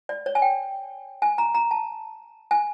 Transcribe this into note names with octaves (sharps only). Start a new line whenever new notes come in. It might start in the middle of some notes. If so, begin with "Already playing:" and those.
D5
C#5
G#5
G5
G#5
A#5
A#5
A5
G#5